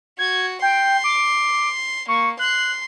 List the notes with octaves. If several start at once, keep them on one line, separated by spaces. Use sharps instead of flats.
F#4 G#6
G5 C6
D6
A#3 C#6
C6 F#6